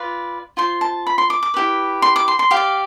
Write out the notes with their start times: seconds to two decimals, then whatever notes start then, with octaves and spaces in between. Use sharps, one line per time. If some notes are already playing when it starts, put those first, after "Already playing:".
Already playing: F4 B4 D5
0.57 F4 C5 C6
0.81 A5
1.07 B5
1.18 C6
1.30 D6
1.43 D6
1.54 E4 G4 B4
2.02 C6
2.16 D6
2.28 C6
2.39 C6
2.51 G4 F5
2.57 D5